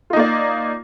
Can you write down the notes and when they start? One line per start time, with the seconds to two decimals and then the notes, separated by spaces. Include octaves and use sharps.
0.10 F4
0.13 D#4
0.16 A#3
0.19 D5